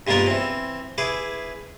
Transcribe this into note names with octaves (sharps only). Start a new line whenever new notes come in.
G2 G#3 A#3 B3 F4 A#4
E3 C4
E4 G#4 B4 D6